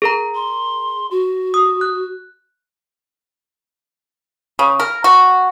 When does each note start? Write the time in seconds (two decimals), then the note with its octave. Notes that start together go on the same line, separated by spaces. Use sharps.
0.02 G#4 A#4 A#5
0.35 C6
1.11 F#4
1.54 D#6
1.81 F#6
4.59 C#3
4.80 A#4
5.04 F#4